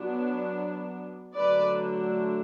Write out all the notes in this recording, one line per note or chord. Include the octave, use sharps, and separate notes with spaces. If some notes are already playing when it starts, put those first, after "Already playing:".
Already playing: F#3 B3 D4
D3 F#3 A3 D4 B4 D5